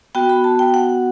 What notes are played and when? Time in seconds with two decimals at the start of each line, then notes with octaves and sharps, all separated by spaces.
0.15 B3 F#4 G5
0.29 B5
0.44 A5
0.59 G5
0.74 F#5